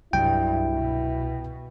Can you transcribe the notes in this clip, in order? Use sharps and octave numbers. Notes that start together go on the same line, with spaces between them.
C2 G2 F#3 E4 G5
B2